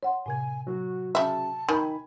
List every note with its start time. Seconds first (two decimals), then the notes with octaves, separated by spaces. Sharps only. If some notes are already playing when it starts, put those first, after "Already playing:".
0.03 C#5 F#5 C6
0.26 A2 C3 G#5 G#6
0.67 F#3 F#4
1.15 C#3 E5 A5
1.69 D#3 G#5 B5